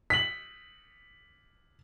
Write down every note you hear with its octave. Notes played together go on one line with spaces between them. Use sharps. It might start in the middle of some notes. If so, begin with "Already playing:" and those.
B6 F#7